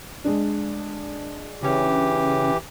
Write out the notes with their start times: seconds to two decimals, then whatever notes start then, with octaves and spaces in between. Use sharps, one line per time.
0.24 G#3 D4
1.63 C#3 E3 C#4 G4